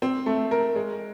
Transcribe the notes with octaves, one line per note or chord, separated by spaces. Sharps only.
C4
A3
A#4
G#3